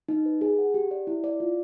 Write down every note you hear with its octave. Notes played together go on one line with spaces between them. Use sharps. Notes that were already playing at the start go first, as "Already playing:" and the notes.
D#4
B4
G#4
F#5
G4
D5
E4
D5
F4